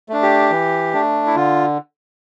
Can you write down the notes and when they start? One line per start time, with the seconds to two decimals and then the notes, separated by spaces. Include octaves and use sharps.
0.09 A3 D4
0.22 G4
0.51 E3
0.93 A3 D4
1.27 E4
1.35 D3 F4